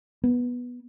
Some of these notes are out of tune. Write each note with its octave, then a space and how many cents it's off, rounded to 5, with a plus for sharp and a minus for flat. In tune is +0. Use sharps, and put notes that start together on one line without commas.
B3 -10